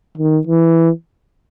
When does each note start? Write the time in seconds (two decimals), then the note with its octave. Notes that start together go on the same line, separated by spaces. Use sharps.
0.18 D#3
0.47 E3